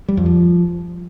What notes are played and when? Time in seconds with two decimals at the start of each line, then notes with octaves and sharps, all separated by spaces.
0.08 G3
0.17 F2
0.26 F3